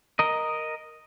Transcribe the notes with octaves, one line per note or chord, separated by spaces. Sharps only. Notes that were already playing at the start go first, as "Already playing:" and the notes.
A#4 D#5